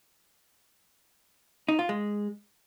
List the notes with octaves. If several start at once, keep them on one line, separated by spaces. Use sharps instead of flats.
D#4
F4
G#3